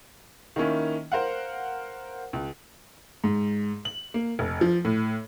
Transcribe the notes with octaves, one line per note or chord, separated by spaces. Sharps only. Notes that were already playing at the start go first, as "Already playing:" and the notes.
D#3 A#3 C#4 E4
A#4 C5 F5 F#5
C#2
G#2
F#7
A#3
F1
F3
A2